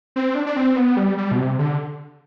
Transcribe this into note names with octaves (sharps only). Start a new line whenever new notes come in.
C4
D4
D4
C4
B3
G3
G3
B2
C3
D3